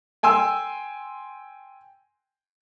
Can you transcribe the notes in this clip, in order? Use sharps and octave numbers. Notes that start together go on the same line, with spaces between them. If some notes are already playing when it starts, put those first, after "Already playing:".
G5 G#5 C6 E6